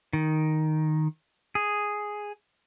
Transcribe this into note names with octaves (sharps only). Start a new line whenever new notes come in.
D#3
G#4